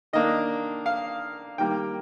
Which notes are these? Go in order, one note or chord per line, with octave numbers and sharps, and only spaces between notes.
D#3 A#3 D4 D#5
F5
D#3 G3 A#3 G5